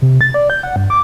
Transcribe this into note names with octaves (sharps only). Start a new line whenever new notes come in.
C3
A6
D5
G6
F#5
G2
D6